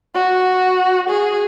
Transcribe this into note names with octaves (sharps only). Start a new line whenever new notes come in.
F#4
G#4